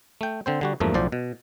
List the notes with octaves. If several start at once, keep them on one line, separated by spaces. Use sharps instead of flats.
A3 G5
D3 C4 C5
D3 G3 F#4
E2 G2 F3 A3 A#3
B1 A2 F3 C5 D5
B2